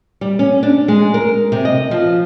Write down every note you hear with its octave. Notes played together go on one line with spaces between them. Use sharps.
G3
C#4
D4
G#3
A#4
C3
D#5
F3